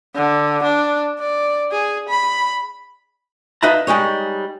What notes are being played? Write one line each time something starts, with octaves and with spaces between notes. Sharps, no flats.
D3
D4
D5
G#4
B5
D#4 F4 B4 E5 A5 A#5
G3 G#3 D#4 C#5